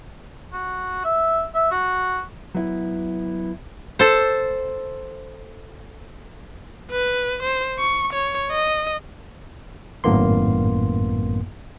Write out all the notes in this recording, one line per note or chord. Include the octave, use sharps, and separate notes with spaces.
F#4
E5
E5
F#4
F#3 B3 E4
A4 C5
B4
C5
C#6
C#5
D#5
G#1 F#2 A2 A#3 B3 C6